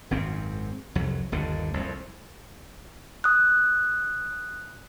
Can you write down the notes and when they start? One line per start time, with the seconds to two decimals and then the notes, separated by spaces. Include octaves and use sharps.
0.11 G#1 F#2 C4
0.95 C2 F2 F#3
1.32 G1 D#2 D3
1.74 C2 F2
3.24 D#6 F#6